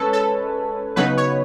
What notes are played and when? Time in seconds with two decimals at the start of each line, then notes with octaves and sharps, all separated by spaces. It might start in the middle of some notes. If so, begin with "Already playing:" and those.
Already playing: G#3 C#4 A4 B4 C#5
0.13 A4
0.96 C#3 F#3 B3 D#4 B4
1.17 C#5